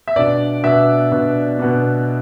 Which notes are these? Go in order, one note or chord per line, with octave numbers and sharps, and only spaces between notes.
E5
B2 B3 D4 D5
B2 B3 D4 E5
B2 B3 D4
B2 B3 D4